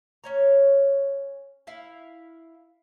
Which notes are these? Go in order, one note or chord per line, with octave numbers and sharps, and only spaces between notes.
C#4 C#5 A#5
E4 E5 F5